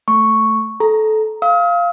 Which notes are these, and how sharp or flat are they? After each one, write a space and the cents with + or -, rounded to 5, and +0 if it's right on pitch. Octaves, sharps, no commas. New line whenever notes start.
A3 +0 C#6 +0
A4 -20 A#5 +0
F5 -5 D#6 +45